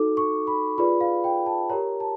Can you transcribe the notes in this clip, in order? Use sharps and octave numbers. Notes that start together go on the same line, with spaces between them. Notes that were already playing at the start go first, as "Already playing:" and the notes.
Already playing: D#4 F#4 A4 D6
C#6
B5
F4 G#4 B4 D5 B5
F5
G5
A5
G4 A#4 C#5 A#5
A5